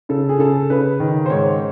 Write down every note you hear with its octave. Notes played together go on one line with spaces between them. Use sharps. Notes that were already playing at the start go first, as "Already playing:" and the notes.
C#3 A4
G#4
C#3 A4
C#3 B4
D#3
C5
G#2 C#5